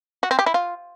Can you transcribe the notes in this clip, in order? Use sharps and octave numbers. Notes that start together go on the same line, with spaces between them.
F#4
C4
G4
E4
F4